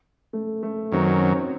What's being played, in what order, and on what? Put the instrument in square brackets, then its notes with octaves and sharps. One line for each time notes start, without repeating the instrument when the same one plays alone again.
[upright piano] A3
A3
[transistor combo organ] F#2 D#3 F#3 [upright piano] C4
[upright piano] C#4
C4
C4